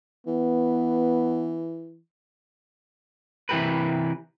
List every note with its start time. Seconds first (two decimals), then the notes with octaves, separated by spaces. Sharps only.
0.27 E3 B3
3.49 C3 E3 F3 G4 A#4 B4